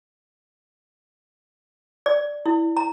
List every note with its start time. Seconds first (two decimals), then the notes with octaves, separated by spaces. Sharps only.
2.06 D5
2.46 E4
2.77 A#5